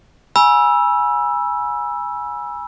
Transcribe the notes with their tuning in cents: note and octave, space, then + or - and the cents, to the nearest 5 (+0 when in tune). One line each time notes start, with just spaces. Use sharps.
G#5 +0 B5 -35 E6 +5